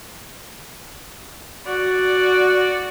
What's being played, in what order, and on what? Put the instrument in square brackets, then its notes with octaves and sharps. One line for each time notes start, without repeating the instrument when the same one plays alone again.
[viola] F#4 D5